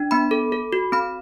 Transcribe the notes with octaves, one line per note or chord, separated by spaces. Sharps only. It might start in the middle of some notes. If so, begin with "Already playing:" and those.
Already playing: D4
B3 B5
A4
A4
F#4
C4 B5